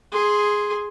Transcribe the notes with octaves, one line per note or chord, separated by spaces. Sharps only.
G#4 C6